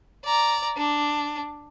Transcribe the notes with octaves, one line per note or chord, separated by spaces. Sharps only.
D5 A#5
D4